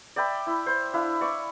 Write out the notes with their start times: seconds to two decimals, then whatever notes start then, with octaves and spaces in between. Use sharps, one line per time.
0.16 D5 E5 G5 B5
0.47 E4
0.66 C5
0.93 D4 E4 F5
1.21 D5 C#6